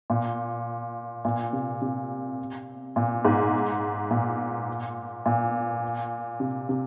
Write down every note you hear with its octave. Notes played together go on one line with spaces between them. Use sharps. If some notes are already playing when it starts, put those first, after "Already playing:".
A#2
A#2
C3
C3
A#2
G#2
A#2
A#2
C3
C3